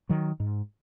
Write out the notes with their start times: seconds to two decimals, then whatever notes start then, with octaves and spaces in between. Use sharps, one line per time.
0.09 D#3 F#3
0.40 G#2